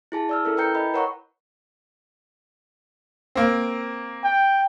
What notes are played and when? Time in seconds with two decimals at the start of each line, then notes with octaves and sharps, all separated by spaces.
0.12 E4 G#4 A5
0.29 D5 E6 F6
0.45 C#4 E4 A4 A#4
0.57 E4 B4 G5 A#5 G6 C#7
0.75 D#5 B5
0.94 A#4 B4 C#5 F#5 A#5 C#6
3.35 A#3 C4
4.24 G5